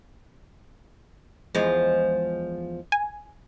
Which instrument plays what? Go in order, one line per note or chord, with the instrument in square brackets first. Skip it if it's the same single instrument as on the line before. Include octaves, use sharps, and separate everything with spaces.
[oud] E2 F3 G#3
[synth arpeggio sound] G#5